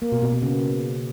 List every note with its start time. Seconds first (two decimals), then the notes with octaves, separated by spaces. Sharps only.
0.02 A#3
0.12 B2
0.22 B2
0.32 B2
0.42 C#3